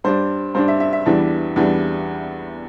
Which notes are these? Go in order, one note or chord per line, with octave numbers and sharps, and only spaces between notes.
G2 G3 D4 C5
G2 G3 D4 C5
E5
E5
E5
E2 E3 G3 D4
E2 E3 G3 D4